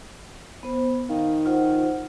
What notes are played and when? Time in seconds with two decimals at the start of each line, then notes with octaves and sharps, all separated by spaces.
0.63 B3 C5
1.09 D#3 F5
1.46 F4 C5 F#5